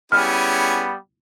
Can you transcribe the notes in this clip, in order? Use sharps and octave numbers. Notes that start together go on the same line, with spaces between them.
G3 B3 C#4 E4 G#4 F6